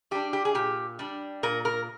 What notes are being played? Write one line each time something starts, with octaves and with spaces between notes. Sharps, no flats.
G3 D4 G4
G4
G#4
A#2 G4
G3 D4
A#2 A#4
A#4